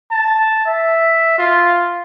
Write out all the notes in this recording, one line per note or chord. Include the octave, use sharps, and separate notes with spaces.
A5
E5
F4